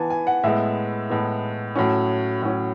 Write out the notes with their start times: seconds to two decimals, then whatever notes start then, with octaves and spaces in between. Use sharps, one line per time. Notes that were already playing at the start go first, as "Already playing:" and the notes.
Already playing: E3 B3 G#5 A5
0.10 G#5
0.27 F#5
0.43 A2 G#3 B3 E5
1.10 A2 G#3 B3
1.75 A2 F#3 C#4
2.42 A2 F#3 C#4